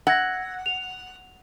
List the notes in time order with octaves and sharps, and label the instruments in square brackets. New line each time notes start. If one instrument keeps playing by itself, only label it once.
[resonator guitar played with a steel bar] F#5 [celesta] E6 G#6 A#6
[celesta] F7